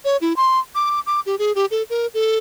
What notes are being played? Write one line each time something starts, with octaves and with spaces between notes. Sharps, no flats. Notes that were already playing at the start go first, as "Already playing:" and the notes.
C#5
E4
C6
D6
D6
G4
G#4
G4
A4
A#4
A4